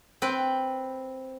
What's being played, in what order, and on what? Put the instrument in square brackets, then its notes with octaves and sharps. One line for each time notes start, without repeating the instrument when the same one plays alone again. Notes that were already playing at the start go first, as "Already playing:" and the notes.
[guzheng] C4 B4 G5